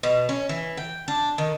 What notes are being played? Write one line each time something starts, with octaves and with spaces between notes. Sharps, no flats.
B2
C#4
E3
G5
D4
D#3